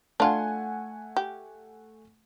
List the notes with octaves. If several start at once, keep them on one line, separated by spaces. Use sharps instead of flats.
A3 D4 F4 F#5 G#5
G4